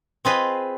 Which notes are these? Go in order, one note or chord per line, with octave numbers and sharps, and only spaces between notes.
C4 F4 G#4 B4 D#5